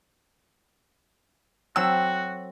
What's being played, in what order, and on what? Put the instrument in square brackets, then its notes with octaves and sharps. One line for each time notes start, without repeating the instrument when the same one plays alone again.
[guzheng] F#3 C4 A4 [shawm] F#4 [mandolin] E6